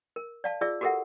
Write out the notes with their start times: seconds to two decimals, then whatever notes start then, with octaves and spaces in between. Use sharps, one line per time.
0.16 A#4
0.44 D5 F5 A5
0.61 F4 G#4 D5 E5 E6
0.81 F#4 G4 A4 A#4 E5 F#5